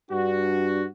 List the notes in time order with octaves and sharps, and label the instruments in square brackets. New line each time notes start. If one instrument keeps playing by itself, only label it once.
[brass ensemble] G2 D4 F#4